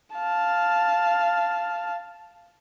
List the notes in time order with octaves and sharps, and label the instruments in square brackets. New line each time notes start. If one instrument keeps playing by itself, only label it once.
[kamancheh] F5 A5